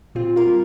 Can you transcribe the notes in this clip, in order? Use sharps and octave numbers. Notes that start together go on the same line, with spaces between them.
A#2 C4 F4
F4 A#4
G3